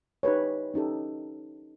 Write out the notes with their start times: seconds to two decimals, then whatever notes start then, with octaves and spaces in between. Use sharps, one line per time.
0.23 D#4 G4 B4 C#5
0.74 C#4 D#4 G4 A4